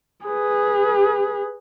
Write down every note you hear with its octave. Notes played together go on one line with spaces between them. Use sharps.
G#4 B4